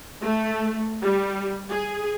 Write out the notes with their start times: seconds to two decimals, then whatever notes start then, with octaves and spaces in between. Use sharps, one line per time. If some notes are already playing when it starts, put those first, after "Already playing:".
0.22 A3
1.02 G3
1.70 G#4